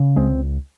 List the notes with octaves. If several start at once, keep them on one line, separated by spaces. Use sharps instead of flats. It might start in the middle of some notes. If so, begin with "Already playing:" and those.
Already playing: C#3
C#2 G#3 C4